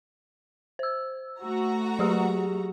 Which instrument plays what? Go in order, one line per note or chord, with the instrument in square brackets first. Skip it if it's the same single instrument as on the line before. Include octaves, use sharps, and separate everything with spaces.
[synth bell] C5 E6
[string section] A3 F#4 A#5
[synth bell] F#3 G4 G#4